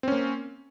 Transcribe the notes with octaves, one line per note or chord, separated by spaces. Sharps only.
A#3 C4 C#4